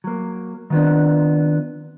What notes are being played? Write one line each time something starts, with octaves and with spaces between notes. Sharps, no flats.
F#3 A#3
D#3 F3 B3 C4 D4